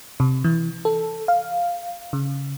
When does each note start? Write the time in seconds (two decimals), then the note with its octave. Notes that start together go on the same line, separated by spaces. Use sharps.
0.20 C3
0.44 E3
0.85 A4
1.28 F5
2.13 C#3